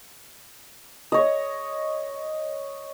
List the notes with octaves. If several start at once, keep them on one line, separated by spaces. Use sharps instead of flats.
C#5 D#5